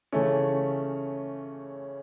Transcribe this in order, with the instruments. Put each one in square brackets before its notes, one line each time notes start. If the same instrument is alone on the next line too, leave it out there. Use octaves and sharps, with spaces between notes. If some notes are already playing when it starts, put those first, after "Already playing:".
[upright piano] C#3 E3 A3 C#4